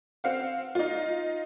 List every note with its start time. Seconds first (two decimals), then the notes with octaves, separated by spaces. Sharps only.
0.24 C4 F5 F#5
0.75 D#4 F4